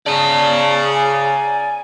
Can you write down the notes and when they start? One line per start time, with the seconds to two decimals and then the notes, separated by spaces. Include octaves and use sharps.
0.06 C#3 D5 A5 A#5
0.94 G#5